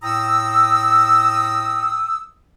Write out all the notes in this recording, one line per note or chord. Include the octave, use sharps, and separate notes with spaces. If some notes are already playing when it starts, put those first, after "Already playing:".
A2 G5 A#5 D#6 E6